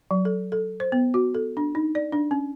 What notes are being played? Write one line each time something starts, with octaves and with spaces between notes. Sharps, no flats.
F#3
A4
A4
C5
B3
F#4
A4
D4
D#4
D5
D4
C#4